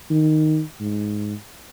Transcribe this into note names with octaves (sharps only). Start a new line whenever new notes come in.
D#3
G#2